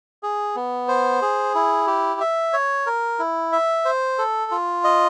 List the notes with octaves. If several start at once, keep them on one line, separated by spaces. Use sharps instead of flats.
G#4
B3
C5
G#4
E4
G4
E5
C#5
A#4
E4
E5
C5
A4
F4
D#5